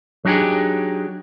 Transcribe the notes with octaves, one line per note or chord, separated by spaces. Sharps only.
F#3 D4 D#4 G4 G#4